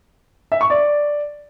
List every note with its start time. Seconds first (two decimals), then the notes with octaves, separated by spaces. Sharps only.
0.52 E5
0.61 C#6
0.70 D5